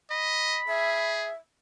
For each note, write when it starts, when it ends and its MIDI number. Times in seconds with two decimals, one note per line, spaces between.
0.11 0.60 75
0.11 1.23 83
0.68 1.30 68
0.68 1.33 76